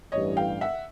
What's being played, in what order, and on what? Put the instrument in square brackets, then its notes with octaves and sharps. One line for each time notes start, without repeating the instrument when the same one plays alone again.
[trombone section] A1 G2 E3 [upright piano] C#5 D#5
[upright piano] F5 G5
E5 F#5